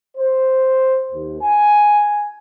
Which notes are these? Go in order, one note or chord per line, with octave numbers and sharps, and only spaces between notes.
C5
D#2
G#5